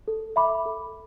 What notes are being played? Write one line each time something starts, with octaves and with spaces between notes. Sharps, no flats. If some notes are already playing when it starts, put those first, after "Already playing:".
A4
E5 B5 D6
A4